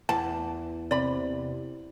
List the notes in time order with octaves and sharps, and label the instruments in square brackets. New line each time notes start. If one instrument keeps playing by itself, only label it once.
[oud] E2 [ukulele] A5
[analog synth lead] C3 [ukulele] D5 B5